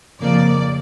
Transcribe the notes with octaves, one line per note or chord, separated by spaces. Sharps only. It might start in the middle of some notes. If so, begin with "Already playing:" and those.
F2 C#3 F3 A#3 D5